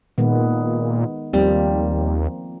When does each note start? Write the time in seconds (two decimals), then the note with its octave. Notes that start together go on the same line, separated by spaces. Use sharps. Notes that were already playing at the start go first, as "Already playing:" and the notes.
0.18 A#2 D#3 G#3 B3
1.33 D#2 F3 G3 A#3 C4